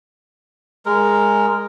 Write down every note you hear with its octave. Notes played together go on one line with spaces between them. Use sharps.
G#3 A#4